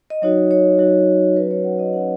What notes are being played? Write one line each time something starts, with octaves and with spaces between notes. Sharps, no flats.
D#5
F#3 D#4 F#4 C#5
C#5
F#3 D#4 F#4
F#3 C#4 F#4 B4
C#5
F#5
D#5
F#3 C#4 F#4 F#5